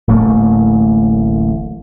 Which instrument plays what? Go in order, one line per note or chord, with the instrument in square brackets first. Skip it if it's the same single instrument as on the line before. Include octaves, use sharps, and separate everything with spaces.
[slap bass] D1 A1 A3 A#3